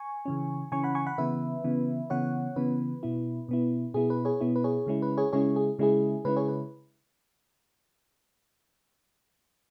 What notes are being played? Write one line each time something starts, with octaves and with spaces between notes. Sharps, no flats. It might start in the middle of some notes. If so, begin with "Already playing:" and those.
Already playing: G#5 C#6
C#3 E3 C#4
C#3 E3 C#4 G#5 C#6
F#5 B5
G#5 C#6
F#5 B5
C#3 E3 B3 B4 E5
C#3 E3 B3
C#3 E3 B3 C#5 F#5
C#3 E3 B3 B4
B2 B3 E4
B2 B3 E4
B2 B3 E4 G#4
B4
G#4 C#5
B2 B3 E4
B4
G#4 C#5
C#3 G#3 C#4 E4
B4
G#4 C#5
C#3 G#3 C#4 E4 G#4 C#5
G#4
C#3 G#3 C#4 E4 G#4
C#3 G#3 C#4 E4 B4
G#4 C#5
B4